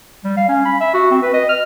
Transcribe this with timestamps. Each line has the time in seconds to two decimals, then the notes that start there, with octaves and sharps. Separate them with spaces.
0.24 G3
0.37 F5
0.49 C#4
0.65 B5
0.81 E5
0.94 F#4
1.11 C4
1.22 B4
1.34 D#5
1.49 F6